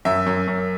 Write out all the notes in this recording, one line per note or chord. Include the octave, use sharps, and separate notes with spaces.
F#2 E5
F#2
F#2